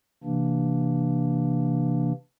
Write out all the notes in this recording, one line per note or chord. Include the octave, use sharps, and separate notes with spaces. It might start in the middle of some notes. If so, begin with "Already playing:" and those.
C3 E3 A#3 D4